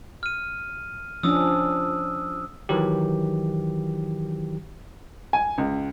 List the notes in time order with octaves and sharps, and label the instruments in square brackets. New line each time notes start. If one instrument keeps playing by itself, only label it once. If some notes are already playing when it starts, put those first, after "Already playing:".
[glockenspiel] F6 D#7
[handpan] F3 C#4 D4 [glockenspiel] D#6 E6
[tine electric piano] D#3 E3 F#3 G4
[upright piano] G#5
C#2